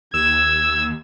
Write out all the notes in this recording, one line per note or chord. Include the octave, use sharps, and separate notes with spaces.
D#2 E6 G#6